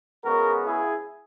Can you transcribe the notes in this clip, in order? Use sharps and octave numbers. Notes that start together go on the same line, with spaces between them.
C#3 G#3 B3 F#4 A#4
E4 G#4